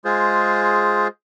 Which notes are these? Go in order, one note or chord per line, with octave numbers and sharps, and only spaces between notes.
G#3 F4 G#4 C5